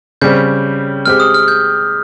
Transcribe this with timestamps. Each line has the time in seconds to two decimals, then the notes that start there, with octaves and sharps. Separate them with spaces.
0.21 C#3 G3 C4 G6
1.05 G#3 C4 G4 F6
1.20 D#6
1.34 F6
1.48 G6